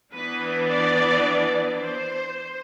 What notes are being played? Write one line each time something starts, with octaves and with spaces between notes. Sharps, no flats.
E3 B3 D4 B4
D5
C5